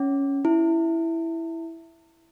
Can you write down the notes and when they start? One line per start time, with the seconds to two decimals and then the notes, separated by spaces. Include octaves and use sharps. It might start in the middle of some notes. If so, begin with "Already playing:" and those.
Already playing: C#4
0.45 E4